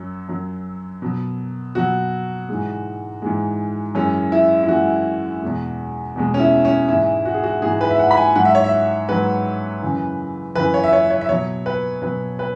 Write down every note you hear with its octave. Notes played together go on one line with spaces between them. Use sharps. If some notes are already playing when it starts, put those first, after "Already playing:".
Already playing: F#2 F#3
F#2 F#3
B2 F#3
B2 F#3 F#4
G#2 E3 G#3
G#2 E3 G#3
F#2 E3 G#3 C#4
E4
E4
F#2 E3 G#3 F#4
E2 B2 G#3
E2 B2 G#3
C#4
E4
C#4
G#2 E3 G#3 E4
F#4
G#4
F#4
G#2 E3 G#3 G#4
B4
E5
F#5
B5
G#5
G#2 F#3 F#5
E5
C#5
E5
G#2 F#3 B4
F#2 C#3 E3
F#2 C#3 E3 B4
C#5
E5
C#5
C#5
E5
B2 F#3 C#5
B4
B2 F#3 B4
B4